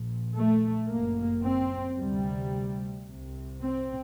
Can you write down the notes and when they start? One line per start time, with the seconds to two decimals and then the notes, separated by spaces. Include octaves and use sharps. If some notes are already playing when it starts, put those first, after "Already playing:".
Already playing: A#1 A#2
0.35 A3
0.89 G1 F#2 A#3
1.44 C4
1.98 D2 C3 G3
3.07 C2 C3
3.61 C4